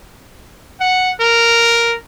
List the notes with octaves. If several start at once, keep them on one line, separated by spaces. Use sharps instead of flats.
F#5
A#4